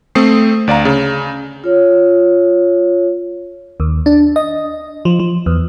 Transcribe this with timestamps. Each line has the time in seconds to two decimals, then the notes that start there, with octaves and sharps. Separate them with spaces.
0.15 A3 C4 D#6 C7
0.68 D2 D5 F5 A#5
0.85 C#3
1.64 F4 C#5
3.80 D#2
4.06 D4
4.36 D#5
5.05 F3
5.19 F3
5.46 E2